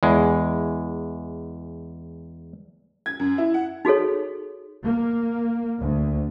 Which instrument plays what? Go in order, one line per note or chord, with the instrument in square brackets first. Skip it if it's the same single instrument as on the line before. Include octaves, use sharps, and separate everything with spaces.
[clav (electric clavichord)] E2 G#3
[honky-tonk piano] G#6
F#2
E4
F#5
[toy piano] D#4 F#4 G#4 A4 C#5
[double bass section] A#3
D2